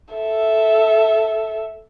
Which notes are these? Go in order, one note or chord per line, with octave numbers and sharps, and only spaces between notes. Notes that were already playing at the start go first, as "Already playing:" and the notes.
A4 E5